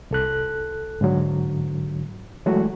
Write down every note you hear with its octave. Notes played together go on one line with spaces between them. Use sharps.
C2 A4 F#6
G#2 D3 F#3
E3 F#3 G#3 A3 F#4